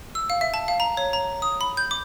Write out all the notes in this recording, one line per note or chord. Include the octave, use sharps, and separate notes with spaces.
E6
F5
E5
A5
F5
A#5
C#5
A#5
D#6
B5
G6
D6